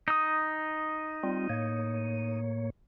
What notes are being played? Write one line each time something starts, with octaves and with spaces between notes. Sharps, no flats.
D#4 D#6
G3 C4 F4
A2 A#3 C#5